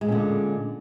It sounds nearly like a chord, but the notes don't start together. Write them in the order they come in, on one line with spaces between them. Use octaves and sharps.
G#3 A#2 C#4 D3